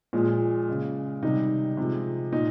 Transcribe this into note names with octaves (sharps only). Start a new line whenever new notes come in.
A#2 F3 G#3
C#3 G#3
C3 D#3 G3 D#4
C3 F3 G#3
A#2 D#4